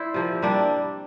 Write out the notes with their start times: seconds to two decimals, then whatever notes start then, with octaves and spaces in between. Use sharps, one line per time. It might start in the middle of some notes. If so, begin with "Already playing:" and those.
Already playing: E4 C5 D5
0.14 C3 F3 A#3
0.42 C3 G3 A#3 D4